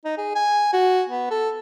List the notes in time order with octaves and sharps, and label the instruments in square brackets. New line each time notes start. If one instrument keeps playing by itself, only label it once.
[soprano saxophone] D#4
G#4
G#5
F#4
B3
A4